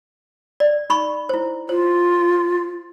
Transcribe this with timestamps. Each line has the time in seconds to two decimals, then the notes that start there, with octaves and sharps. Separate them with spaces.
0.60 D5
0.90 D#4 B5 C#6
1.29 E4 C5
1.69 F4 C5